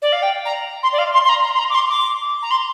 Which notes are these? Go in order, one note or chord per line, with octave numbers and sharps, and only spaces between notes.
D5
F5
G5
A#5
C6
D5
F5
C6
C6
A#5
A#5
C6
A#5
D6
C6
D6
A#5
C6